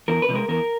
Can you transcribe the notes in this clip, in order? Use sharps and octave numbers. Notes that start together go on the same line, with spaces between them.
E2 A#4
B4
C3 F3 G#3 A#4
E2 A#4